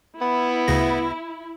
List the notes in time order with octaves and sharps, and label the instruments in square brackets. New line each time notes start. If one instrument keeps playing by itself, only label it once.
[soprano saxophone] B3 [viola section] E4
[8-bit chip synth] D2 C#3 A#6